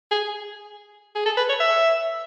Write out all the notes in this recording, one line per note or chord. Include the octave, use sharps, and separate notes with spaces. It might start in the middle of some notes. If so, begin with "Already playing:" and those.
G#4
G#4
A4
B4
C#5
E5